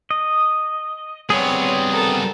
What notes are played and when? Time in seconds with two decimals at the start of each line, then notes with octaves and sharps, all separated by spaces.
0.11 D#5
1.30 G3 B3 C4 G#4 C#5
1.92 A4 A#4